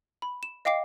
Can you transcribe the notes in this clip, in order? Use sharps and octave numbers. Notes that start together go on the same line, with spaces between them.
B5
E7
D#5 F5 G5 D6 C7